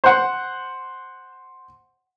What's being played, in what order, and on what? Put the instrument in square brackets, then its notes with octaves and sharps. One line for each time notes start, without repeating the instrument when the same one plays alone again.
[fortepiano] C5 F#5